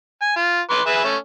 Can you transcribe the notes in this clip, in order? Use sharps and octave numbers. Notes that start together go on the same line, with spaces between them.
G#5
F4
B4 C6 D6
G#4 B4 E5
A3 C#4